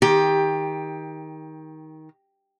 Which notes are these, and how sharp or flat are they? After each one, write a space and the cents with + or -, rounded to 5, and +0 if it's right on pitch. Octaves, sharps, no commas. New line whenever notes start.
D#3 +15 G4 +15